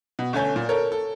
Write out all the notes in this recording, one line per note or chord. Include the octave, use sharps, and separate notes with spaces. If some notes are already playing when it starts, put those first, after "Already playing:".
B2
G1 A3 C#4 G#5 G6
A#2
A4 A#4 C#5
A4